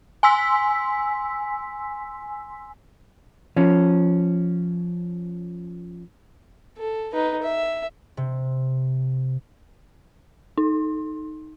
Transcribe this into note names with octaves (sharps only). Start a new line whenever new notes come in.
G#5 C6 E6 B6
F3 C#4
A4
D#4 B4
E5
C3
D#4